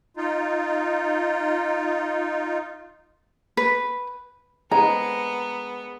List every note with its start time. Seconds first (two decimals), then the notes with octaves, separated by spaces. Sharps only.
0.17 D#4 F4
3.57 B4
4.71 G#3 B3 A#5